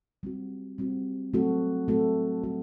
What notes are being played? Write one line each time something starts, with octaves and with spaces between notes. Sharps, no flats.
G3 C4 F#4
G3 C4 F#4
F#3 A3 C4 F#4 A4
F#3 A3 C4 F#4 A4
G3 C4 F#4 A4